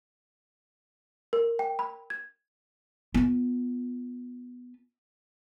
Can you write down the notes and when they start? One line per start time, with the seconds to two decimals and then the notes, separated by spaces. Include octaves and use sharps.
1.33 A#4
1.59 G5
1.79 B5
2.10 G#6
3.14 B3 F4